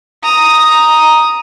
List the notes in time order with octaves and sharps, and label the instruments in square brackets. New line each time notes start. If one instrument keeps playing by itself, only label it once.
[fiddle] A#5 D#6